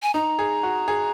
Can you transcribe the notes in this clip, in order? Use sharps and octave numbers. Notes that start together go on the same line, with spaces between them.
G#5
D#4 A#5
G#4
F#4
G#4